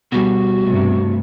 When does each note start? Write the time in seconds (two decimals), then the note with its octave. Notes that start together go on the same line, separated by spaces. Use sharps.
0.12 B2 G3 F#4
0.65 G2 C3 A3